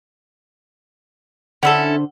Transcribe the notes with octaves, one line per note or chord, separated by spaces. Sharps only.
D3 C#4 D4 E4 A4 C5 F#5 E6